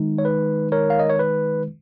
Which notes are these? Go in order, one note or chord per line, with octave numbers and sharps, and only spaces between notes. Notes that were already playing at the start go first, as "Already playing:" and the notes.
Already playing: D#3 G#3 D#4
C#5
B4
A#4 C#5
F5
D#5
C#5
B4